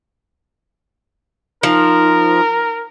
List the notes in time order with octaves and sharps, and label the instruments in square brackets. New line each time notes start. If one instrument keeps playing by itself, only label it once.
[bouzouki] F3 [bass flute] D#4 [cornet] A#4